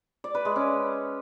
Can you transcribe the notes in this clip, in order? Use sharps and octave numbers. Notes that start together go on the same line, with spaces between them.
D5
B4
G#3
C#4